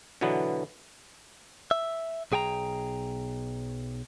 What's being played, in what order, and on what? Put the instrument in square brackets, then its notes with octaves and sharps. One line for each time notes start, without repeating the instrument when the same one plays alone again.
[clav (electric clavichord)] B2 D3 E3 F#3 B3
[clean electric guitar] E5
B1 G#4 G5 G#5 A#5